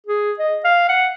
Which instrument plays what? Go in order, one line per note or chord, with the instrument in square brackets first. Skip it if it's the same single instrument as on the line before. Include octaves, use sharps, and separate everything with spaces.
[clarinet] G#4
D#5
F5
F#5